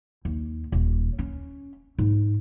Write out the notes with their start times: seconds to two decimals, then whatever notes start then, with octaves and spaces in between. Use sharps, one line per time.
0.25 D#2
0.72 D#1
1.18 C#4
1.98 G#2